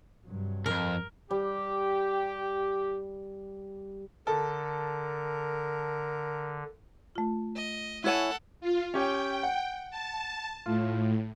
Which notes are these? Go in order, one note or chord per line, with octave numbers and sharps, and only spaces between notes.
G2 C3 F#3
C2 F2 A#4
G3 G4
D3 A4 A#4
A3 F4
D#5
E4 A4 C#5 F#5 G#5
F4
C#4 G4 G5
F#5
A5
A2 F4